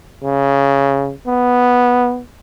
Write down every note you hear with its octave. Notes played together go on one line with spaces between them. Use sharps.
C#3
B3